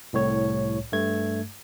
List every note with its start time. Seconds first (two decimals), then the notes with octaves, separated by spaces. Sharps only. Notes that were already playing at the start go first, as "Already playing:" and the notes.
0.13 C2 A2 C#5
0.92 G2 A3 G#6